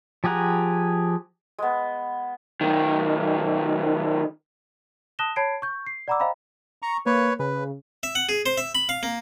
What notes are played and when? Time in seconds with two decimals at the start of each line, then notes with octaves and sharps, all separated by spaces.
0.24 F3 G4 G#4 F#5 A#5
1.58 G#3 B3
2.61 B1 D#3
5.19 A5 D#6 F#6 A#6 E7 G7
5.36 C#5 A5 B5 G#6 C7 D7
5.62 C#6 G6
5.87 C7
6.08 D5 F#5 A#5 B5 D6 E6
6.20 C5 D#5 F5 G5 A#5 B5
6.82 A#5 C#6
7.06 A#3 B4 C#5
7.39 C#3 B4
8.03 E5
8.15 F#5
8.29 G#4
8.46 C5
8.58 E5
8.75 B5
8.89 F5
9.03 A#3